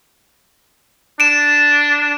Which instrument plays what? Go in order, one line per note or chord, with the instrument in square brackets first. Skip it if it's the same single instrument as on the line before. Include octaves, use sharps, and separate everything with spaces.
[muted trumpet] D4 [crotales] D7 E7